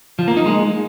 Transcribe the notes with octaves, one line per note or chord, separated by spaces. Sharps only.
F3
A#3
D#4
G#3